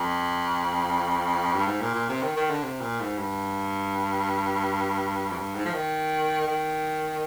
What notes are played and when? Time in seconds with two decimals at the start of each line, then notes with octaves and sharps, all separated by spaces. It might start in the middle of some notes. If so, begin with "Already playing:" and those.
Already playing: F2
1.54 G2
1.67 G#2
1.81 A#2
1.94 A#2
2.09 C3
2.23 D#3
2.36 D#3
2.50 D3
2.63 C3
2.81 A#2
3.01 G#2
3.18 G2
5.31 F2
5.38 G2
5.55 G#2
5.65 F3
5.74 D#3
6.47 D#3